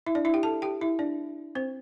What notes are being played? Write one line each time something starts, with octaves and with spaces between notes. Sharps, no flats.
E4 E5
D4 D5
E4 E5
G4 G5
A4 A5
G4 G5
E4 E5
D4 D5
C4 C5